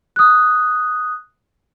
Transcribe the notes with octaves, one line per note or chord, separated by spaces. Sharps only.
D#6 F#6